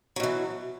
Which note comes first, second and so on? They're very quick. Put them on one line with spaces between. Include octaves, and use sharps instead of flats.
F#3 B2 E3